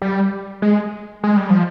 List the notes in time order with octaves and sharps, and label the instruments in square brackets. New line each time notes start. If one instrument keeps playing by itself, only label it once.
[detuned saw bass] G3
G#3
G#3
G3
F3